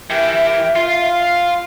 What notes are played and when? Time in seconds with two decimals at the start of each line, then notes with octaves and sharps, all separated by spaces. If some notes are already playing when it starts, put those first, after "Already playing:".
0.10 E3 G4 A#4 E5 G5
0.76 F4 F5 C6